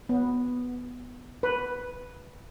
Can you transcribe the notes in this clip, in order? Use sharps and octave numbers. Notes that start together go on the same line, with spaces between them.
B3
B4